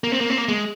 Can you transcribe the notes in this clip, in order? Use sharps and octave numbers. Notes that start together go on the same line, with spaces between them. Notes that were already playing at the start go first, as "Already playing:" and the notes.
A#3
C4
A#3
C4
A#3
G#3